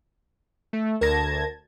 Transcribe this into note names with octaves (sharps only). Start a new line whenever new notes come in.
A3
D2 A#4 A5 G#6 A#6